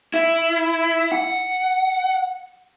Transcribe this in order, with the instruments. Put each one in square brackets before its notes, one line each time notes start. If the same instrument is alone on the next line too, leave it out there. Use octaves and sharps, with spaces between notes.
[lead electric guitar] E4
F#5